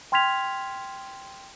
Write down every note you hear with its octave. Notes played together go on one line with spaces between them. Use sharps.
G5 C6 F6 G#6 B6 F7